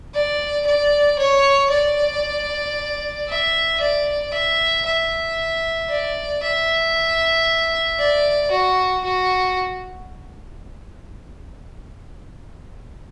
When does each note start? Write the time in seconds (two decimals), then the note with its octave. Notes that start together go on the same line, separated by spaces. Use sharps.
0.14 D5
0.66 D5
1.19 C#5
1.70 D5
3.29 E5
3.80 D5
4.33 E5
4.86 E5
5.90 D5
6.43 E5
7.99 D5
8.51 F#4
9.04 F#4